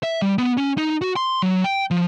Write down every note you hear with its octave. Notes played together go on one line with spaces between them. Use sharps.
E5
G3
B3
C#4
D#4
F#4
C6
F#3
G5
F3